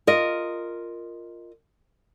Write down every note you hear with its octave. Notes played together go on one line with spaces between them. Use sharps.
F4 A#4 D#5